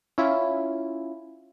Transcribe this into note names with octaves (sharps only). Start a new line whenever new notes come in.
C#4 E4 F4